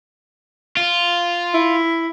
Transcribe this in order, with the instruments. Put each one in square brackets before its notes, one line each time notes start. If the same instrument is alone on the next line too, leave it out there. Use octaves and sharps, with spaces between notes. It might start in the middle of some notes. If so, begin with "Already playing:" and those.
[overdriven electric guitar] F4
[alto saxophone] E4